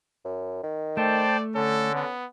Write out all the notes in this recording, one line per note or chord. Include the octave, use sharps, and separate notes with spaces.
F#2
D#3
A3 C5 D5 G5 A5
D3 C#4 A4
B3